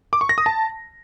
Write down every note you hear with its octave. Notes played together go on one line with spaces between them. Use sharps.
D6
C#6
A#6
D#6
A5